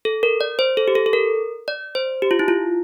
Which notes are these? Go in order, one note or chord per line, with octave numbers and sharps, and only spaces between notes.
A4
A#4
D5
C5
A4
G4
A4
A4
A#4
D5
C5
G4
F4
E4
F4